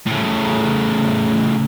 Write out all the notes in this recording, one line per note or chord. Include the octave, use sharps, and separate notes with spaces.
A2 C#3